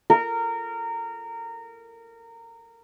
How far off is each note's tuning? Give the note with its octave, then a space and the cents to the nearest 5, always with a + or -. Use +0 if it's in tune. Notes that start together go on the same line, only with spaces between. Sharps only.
A#4 -20